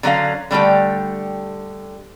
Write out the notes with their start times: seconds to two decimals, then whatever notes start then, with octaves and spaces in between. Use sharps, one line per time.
0.03 D3 F#3 C#4 F5
0.51 D3 G3 A3 G4